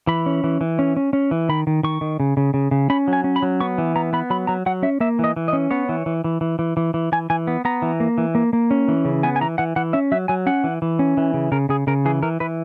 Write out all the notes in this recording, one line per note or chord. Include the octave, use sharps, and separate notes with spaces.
E3 B5
C#4
E3
E3
C#4
C#4
C#4
E3
D#3 B5
D#3
D#3 C#6
D#3
C#3
C#3
C#3
C#3
C#4 B5
F#3
G#5
C#4
B5
F#3
B3 C#6
E3
B3 A#5
B3 B5
F#3 B5
F#3 A#5
F#3 F#5
C#4 E5
A#3 E5
E3 D#5
E3
D#5
C#4
B3 C#5
E3
E3
E3
E3
E3
E3
E3
E3 G#5
E3 G#5
B3
B3 A#5
E3
A#3
E3
A#3
A#3
C#4
E3
C#3
B3 G#5
G#5
E3 A#5
E3 F#5
E3 F#5
C#4 E5
F#3 E5
F#3 G#5
C#4 F#5
E3
E3
C#4
E3
C#3
C#3 A#4
C#3 G#4
C#3 A#4
E3 G#4
E3 A#4
E3 B4